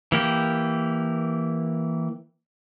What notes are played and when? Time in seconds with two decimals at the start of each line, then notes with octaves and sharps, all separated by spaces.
0.12 E3 A#3 G4